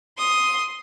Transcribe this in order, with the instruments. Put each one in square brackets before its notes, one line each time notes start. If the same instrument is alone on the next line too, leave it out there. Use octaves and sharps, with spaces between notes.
[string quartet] C6 D#6